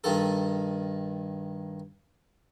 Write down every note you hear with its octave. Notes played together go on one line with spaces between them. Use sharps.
G2 D#3 A4